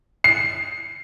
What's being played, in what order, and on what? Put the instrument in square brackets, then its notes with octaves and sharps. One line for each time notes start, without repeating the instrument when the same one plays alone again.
[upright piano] C7